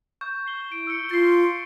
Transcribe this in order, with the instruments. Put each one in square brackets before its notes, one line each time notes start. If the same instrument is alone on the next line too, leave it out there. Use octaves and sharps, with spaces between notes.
[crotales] C#6 G6
C7 G7
[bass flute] E4 [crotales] D7
[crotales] E6 C#7
[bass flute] F4 [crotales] A6 C7
[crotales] C7